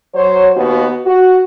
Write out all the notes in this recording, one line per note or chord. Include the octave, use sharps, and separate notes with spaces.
F#3 C5 C#5
D#2 B3 F#4
F#4